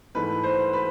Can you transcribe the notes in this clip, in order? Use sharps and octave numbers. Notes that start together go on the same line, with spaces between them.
G#2 E3 A3 B4
C5
B4